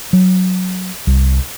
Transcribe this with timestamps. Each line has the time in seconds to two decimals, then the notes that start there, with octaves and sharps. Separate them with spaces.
0.13 F#3
1.07 C2